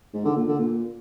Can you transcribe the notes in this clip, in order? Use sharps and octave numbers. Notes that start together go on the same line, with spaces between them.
G#2
D3
A#2
D3
A#2